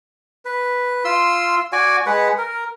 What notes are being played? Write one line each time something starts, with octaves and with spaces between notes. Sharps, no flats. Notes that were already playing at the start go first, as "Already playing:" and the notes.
B4
F4 C6 E6
F#4 D5 G#5
G#3 B4 F#5
A#4